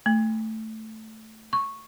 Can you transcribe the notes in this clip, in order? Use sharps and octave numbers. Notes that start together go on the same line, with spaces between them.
A3
C#6